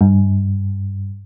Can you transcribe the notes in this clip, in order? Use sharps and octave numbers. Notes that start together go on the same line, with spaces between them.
G2